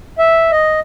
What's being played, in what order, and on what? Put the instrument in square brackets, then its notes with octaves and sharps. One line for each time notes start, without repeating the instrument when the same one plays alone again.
[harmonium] E5
D#5